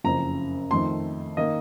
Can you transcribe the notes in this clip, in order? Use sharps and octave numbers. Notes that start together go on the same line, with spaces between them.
F#1 F2 C#3 F3 A#5
F2 D#3 A3 C6
D#3 A#3 D#5